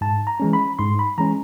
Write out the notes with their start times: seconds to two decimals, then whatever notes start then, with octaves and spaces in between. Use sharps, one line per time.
0.01 G#2 A5
0.27 A#5
0.40 E3 G#3 C#4
0.53 B5
0.79 G#2 C6
0.99 B5
1.18 E3 G#3 C#4 A#5